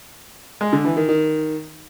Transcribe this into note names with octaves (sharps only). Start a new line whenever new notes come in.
G#3
D3
E3
D#3
D#3